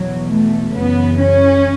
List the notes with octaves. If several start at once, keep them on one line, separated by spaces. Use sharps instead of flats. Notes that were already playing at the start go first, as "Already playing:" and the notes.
Already playing: E2 B2 F#3
A3
F#2 C#3 E3 B3
C#4